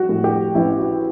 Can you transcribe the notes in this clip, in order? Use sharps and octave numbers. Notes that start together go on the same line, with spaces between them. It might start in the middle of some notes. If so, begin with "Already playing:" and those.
Already playing: G3 F#4
A2
G4
A1 E4
F#4